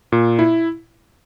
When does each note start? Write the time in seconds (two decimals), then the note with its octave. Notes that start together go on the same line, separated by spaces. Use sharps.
0.12 A#2
0.39 E4